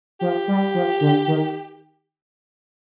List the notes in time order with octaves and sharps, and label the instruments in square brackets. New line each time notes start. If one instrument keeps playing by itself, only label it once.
[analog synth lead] F3 [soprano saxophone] G4
[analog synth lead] G3
F3
D3
D#3